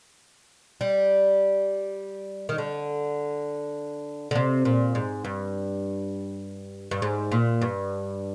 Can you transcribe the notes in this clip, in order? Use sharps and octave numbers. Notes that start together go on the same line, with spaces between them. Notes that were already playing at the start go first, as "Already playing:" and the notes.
G3
D#3
D3
D3
C3
A#2
G#2
G2
G2
G#2
A#2
G2